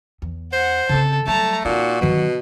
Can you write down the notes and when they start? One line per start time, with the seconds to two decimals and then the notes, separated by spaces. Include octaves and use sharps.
0.22 E2
0.53 C5 F#5
0.89 C#3 C4 A4
1.27 F#3 G3 A3 A5 A#5
1.65 A#2 C4 D#4 F#4
2.01 B2 D#3 F#3